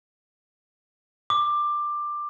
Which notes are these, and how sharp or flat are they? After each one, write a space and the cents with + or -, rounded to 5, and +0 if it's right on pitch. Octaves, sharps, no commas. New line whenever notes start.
D6 +15